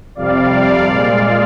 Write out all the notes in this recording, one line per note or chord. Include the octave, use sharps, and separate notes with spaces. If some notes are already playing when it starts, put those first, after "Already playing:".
F2 C3 G3 D5 F5
A#2 G#3